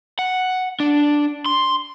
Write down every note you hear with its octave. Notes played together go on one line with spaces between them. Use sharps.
F#5
D4
C6